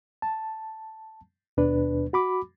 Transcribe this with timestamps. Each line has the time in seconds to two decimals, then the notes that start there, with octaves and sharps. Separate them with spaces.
0.22 A5
1.57 D#2 B2 D4 B4
2.13 F#4 B5 D6